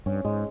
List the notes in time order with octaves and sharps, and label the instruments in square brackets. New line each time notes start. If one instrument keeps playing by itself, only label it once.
[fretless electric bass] G2 [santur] C#4
[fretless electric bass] G#2 [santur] G#3